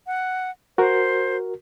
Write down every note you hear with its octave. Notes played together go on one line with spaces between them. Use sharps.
F#5
F#4 A#4 C5